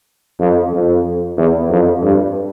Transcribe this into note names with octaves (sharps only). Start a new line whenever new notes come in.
F2
F2
E2
F2
G2